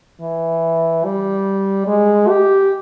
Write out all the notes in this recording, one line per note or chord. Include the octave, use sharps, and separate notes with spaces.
E3
G3
G#3
G4